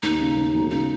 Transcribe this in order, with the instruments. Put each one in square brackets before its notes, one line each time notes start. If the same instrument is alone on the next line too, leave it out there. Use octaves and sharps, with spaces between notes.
[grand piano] D#2 [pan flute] D#4
[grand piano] C#3
D#2
E1
[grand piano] C#3 [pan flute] D#4